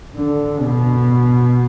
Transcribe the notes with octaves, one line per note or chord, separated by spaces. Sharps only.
D3
B2